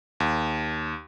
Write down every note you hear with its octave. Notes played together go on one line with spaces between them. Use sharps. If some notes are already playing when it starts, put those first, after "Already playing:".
D#2